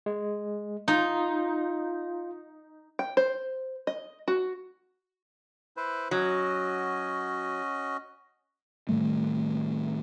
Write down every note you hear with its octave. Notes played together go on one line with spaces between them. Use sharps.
G#3
D#4 F4
G5
C5
D#5
F#4
E4 B4 C5
F#3 C#4 F#4 D#5
A2 D#3 G3 A3